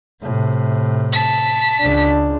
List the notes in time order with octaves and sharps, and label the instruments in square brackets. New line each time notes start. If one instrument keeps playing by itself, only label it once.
[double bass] A2 C3
[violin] A5 B6
[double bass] C#2 D4